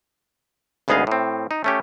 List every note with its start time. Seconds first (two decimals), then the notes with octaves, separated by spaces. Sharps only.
0.88 G#1 D2 B3 G#4 D#5 F5
1.07 A2 C4
1.51 D#4
1.64 A3 C#4 G4